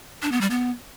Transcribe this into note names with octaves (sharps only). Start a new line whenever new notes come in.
D4
B3
G3
B3